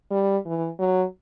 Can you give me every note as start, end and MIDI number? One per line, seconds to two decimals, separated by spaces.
0.11 0.37 55
0.45 0.68 52
0.79 1.04 54